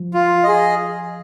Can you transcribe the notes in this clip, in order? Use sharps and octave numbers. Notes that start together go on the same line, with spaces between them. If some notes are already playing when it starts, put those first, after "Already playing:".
Already playing: F3
F4
G#4 D#5